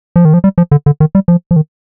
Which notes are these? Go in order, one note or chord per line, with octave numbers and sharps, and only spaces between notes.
F3
D#3
F3
G3
F3
D3
D3
D#3
G3
F3
F3
D#3